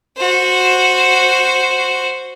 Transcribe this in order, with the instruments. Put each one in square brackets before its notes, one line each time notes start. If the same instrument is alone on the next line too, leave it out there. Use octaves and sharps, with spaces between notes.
[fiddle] F#4 C5